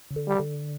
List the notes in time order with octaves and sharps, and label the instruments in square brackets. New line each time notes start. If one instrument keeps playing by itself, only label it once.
[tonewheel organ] C#3
D3
[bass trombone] G3
[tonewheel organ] D3